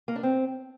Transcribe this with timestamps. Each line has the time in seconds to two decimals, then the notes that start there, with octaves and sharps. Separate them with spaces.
0.08 A#3
0.16 D4
0.23 C4